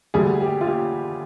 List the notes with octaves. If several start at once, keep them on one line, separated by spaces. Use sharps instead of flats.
D2 D3 G3 G#4
G4
F4
G4